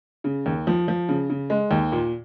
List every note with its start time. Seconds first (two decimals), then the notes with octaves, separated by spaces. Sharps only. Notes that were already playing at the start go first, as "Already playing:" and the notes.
0.24 C#3
0.46 D#2
0.67 F3
0.88 F3
1.09 C#3
1.30 C#3
1.50 G#3
1.71 D#2
1.92 A#2